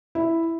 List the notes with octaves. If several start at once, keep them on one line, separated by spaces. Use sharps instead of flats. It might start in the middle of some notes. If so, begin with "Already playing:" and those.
E4